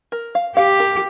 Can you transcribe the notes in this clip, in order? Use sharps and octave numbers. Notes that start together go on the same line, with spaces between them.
A#4
F5
G4 F5
A#4